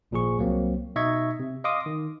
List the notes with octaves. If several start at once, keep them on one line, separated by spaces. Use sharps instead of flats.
G#1 A#2 F3 G#4 C#6
C2 F#3 A#3 C4
B2 D#4 D#5 E5 C#6 G#6
C3
D#5 F5 C6 D6 D#6
D#3